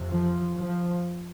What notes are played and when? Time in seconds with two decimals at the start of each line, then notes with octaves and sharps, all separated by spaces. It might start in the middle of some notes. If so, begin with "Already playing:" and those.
Already playing: F2 C3
0.09 F3
0.56 F3